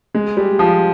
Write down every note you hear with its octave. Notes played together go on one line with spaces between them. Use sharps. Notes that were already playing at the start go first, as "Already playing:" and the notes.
G#3
G3
F3